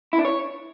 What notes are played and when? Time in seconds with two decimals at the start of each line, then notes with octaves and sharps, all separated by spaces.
0.13 E4
0.19 D4
0.25 C#5